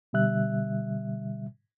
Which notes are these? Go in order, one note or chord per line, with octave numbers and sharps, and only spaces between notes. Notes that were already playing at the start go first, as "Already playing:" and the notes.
B2 D3 G3 E5 F#6